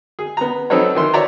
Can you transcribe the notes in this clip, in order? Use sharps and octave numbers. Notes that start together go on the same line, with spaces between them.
G#4
B3 A#5
F#3 C4 D#4 A4 B4 C#5
D#3 E3 C6
C#5 D5 E5 A#5